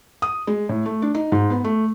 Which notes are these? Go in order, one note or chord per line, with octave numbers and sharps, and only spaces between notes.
D#6
G#3
A2
A3
D4
D#4
G#2
B3
A3